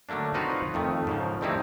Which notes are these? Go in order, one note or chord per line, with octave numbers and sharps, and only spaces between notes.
D3 F#3 A3 A#3 D4
C4 D#4 F4 F#4 B4 C#5
F2 D#3 A3
G#2 C#3 F3
G2 G3 A3 C4 D#4 E4